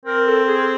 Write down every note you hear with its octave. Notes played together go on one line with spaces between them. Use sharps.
C4 A#4
A4
G#4